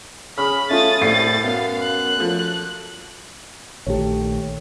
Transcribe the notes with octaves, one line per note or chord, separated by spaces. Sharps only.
C#3 B5 F6
A3 C#4 F4 D#6 A6
C2 A2 A6 C7
F#2 B3 F5
F#6
F3 A3
A#1 D#3 A3 G4 C#5